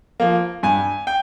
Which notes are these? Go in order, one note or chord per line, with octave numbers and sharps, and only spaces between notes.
F3 A#3
G2 G#5
G5